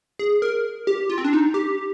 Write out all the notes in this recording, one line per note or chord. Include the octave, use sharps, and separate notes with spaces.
G#4
A#4
G4
F4
C4
D4
D#4
G4